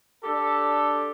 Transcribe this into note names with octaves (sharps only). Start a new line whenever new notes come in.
D4 G4 A4